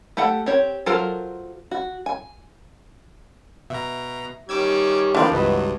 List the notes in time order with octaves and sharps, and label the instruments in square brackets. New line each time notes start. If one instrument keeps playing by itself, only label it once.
[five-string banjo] A3 G4 A4 F#5
C4 G4 C#5
F#3 F4 A4 A#4 C5
F#4
G#5
[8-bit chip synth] B2 A#5 [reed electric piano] E5
[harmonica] D#3 G3 C#4 [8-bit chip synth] D6 E6 G#6
[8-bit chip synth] D3 D5 [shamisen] E3 C4 F4 [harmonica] F3 A#4 [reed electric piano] D4
[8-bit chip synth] C#2 G2 [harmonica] F#3 E5 [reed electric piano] F#4 B4 D#5